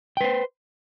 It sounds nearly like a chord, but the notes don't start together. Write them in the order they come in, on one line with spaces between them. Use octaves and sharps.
G5 B4 C5